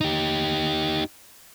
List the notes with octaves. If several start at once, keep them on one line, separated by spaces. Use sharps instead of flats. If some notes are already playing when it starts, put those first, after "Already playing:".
D#4 G4